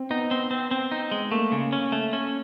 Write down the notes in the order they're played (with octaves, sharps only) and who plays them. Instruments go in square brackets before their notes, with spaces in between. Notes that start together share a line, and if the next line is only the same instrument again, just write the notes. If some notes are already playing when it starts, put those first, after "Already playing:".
Already playing: [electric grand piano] C4
[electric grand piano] B3 [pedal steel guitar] D#4
[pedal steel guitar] C4
C4
C4
D#4
G#3
[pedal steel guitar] A3 [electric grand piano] A#3
[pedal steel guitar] C#3
C#4
A3
C#4